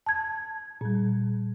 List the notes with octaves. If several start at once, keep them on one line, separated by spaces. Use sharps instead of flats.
A5 G#6
A#2 G3